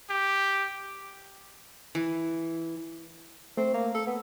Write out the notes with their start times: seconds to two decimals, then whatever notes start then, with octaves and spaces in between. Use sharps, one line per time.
0.10 G4
1.95 E3
3.57 A3 C4
3.74 A#3
3.94 A4
4.07 B3